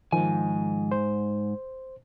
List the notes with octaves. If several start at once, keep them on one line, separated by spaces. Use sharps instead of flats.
G#2 D#3 F3 G#5
C5